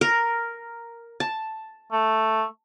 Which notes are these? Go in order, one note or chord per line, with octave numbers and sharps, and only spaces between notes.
A#4
A5
A3